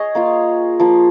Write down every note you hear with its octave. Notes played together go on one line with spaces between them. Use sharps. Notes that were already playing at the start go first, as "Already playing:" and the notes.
Already playing: G#4 C#5 D#5
A#3 F4 F5
F3 A#3 F4